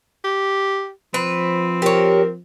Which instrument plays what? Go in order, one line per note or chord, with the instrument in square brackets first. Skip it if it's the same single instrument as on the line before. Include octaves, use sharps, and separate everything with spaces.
[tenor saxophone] G4
[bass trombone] F3 [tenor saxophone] C4 [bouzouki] B4
[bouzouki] G4 C#5 [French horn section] A#4